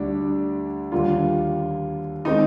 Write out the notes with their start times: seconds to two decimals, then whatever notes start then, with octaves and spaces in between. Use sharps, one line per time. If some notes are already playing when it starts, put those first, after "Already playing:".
Already playing: D2 D3 G3 D4
0.92 D#2 D3 G3 A#3 F4
2.25 D#3 G#3 C4 D#4